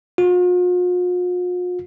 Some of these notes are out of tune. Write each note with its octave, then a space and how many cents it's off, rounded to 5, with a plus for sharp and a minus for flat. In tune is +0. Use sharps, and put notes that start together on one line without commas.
F4 +45